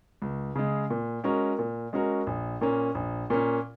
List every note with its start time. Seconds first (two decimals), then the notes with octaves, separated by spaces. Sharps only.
0.22 C#2
0.56 C#3 G#3
0.90 A#2
1.24 G#3 C#4 F#4 A#4
1.59 A#2
1.93 G#3 C#4 F#4 A#4
2.27 A#1
2.61 A#2 A#3 C#4
2.95 A#1
3.30 A#2 A#3 C#4